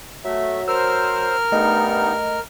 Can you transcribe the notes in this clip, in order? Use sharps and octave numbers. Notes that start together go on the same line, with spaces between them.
F#3 A3 E5
A#4 C5 E6 F6
G2 A3 B3 D#4 D#5